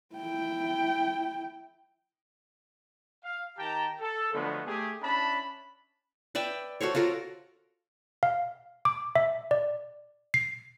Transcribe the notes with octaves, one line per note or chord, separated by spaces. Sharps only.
E4 G5
F5
D#3 G4 G5 A5 A#5
A4
D3 F3 F#3 G#3 A3 B3
A3 G4 G#4
C#4 D4 E4 A5 B5
B4 D5 E5 G5
F#4 A4 C5 C#5
F4 F#4 A4 A#4
F5
D6
E5
D5
C7